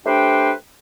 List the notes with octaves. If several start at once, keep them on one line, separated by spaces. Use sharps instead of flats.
A3 D4 G4 B4 C5 G5